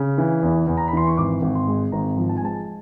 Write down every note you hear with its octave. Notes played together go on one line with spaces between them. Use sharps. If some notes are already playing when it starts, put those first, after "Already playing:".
Already playing: C#3
E3
E2
E2
A#5
B5
E3 C6
C#6
G#1 D6
G#1
C6
G#3
G#1 A#5
F3
A5
G#5
G#3 A5